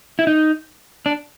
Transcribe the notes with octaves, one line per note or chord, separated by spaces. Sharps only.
E4
D#4
D4